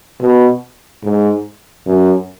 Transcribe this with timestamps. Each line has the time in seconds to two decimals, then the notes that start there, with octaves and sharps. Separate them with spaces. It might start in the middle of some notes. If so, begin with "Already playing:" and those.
0.20 B2
1.03 G#2
1.86 F#2